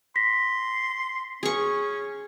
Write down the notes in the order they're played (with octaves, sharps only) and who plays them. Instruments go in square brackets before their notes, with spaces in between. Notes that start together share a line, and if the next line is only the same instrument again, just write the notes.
[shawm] C6 [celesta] A#6 B6
[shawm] C#4 [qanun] G#4 C#6